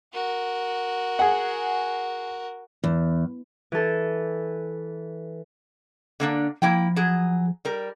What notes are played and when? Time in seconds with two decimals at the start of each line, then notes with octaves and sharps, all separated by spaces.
0.13 F#4 A#4
1.19 G#4 F#5
2.84 E2
3.72 E3 A4
6.20 D3 A#3 D4
6.62 F3 A#3 E4 G5
6.96 F#3 G#4
7.65 G3 A#4